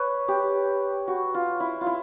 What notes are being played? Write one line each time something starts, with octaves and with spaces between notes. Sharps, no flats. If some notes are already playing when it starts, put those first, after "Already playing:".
Already playing: B4 C#5
G4
F#4
F4
E4
F4
E4